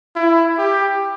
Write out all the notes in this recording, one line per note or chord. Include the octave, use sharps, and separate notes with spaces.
E4
G4